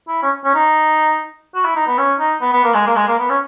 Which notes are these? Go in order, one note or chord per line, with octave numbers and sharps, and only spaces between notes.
E4
C#4
C#4
D#4
F#4
E4
D#4
B3
C#4
D#4
B3
B3
A#3
G#3
A#3
G#3
A#3
B3
C#4